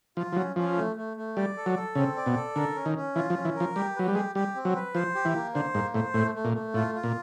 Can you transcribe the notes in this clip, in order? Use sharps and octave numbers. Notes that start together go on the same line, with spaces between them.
F3 F4
F3
F#3 C#4
F3 C#4
A3
A3
A3
G3 D5
A4
F#3
A4
C#3 C4
D5
B2
A4
D3 A#4
C#4
D#3
C#4
E3 F4
F3
C#4
E3
A#4
F3
G3 G4
F#3 B4
G3
G#3 G4
G3 G4
C4
F#3
B4
F3 C5
G4
E3
A#3
D3 C5
G#2 A#3
A2 C5
A2 A3
A3
A#2
A3
A2 F4
F4
A#2